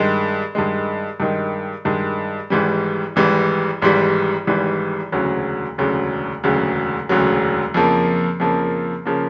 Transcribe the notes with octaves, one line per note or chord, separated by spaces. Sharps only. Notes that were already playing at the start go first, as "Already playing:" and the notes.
Already playing: G2 D#3 G#3
G2 D#3 G#3
G2 D#3 G#3
G2 D#3 G#3
G#1 G#2 E3 G3
G#1 G#2 E3 G3
G#1 G#2 E3 G3
G#1 G#2 E3 G3
E1 D2 C#3 F#3
E1 D2 C#3 F#3
E1 D2 C#3 F#3
E1 D2 C#3 F#3
F2 C#3 F3 A#3
F2 C#3 F3 A#3
C#3 F3 A#3